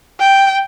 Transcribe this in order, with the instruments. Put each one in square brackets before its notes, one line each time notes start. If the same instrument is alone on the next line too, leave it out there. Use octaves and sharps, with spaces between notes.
[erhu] G5